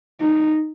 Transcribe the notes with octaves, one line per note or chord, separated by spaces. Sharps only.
D#4